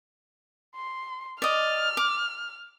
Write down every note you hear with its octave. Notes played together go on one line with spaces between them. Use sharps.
C6
D5 D#5 F6
D6